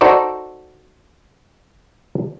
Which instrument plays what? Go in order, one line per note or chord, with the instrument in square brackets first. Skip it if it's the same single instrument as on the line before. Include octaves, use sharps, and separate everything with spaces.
[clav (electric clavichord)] D#4 F#4 A4 C5 D5